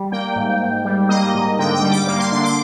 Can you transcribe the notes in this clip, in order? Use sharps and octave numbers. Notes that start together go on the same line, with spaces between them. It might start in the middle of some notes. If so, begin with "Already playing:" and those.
Already playing: G3
A#3 G5
G#2
G#2
G3
A#3 D#5
G#2
D3 G5
G5
G3
D6
A#3 D6
C6
D3 C6
D6